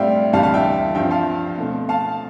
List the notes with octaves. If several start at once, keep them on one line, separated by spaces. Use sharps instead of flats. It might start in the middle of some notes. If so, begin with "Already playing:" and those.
Already playing: A2 G3 C4 D5 E5 F5 G5
D2 C3 E3 G3 F5 A5
F5 A5
E5 G5
G2 F3 C4 E5 G5
F5 A5
B2 A3 C4
F5 A5